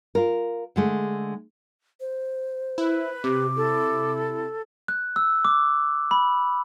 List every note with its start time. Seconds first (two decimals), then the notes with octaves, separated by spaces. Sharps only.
0.15 F4 A#4
0.76 D3 G#3 A3
2.00 C5
2.78 E4 B4
3.24 C3 G4 D6
3.56 E4 A4
4.88 F#6
5.16 E6
5.45 D6
6.11 B5